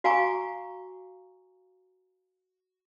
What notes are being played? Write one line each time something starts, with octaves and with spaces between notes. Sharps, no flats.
F#4 F5 G#5 A#5 C#6 D6